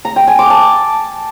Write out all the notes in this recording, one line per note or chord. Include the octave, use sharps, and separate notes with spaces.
A#5
G5
G#5
D6
A5